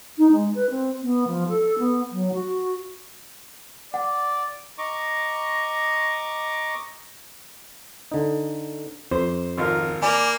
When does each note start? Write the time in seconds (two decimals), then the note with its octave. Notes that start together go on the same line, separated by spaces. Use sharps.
0.18 D#4
0.32 G#3
0.55 B4
0.70 C4
1.02 B3
1.27 F3
1.49 A4
1.79 B3
2.12 F#3
2.34 F#4
3.94 D5 F#5
4.78 D#5 A#5 C#6 D6
8.12 D3 D#4
9.11 F2 C5
9.58 G#1 F4 A#4
10.02 A#3 D5 G#5 B5